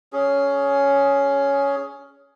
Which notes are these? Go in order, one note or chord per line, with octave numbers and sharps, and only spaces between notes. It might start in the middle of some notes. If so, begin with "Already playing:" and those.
C#4 G#4